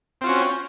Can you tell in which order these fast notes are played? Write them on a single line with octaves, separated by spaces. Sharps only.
C4 F4 F#4 C#4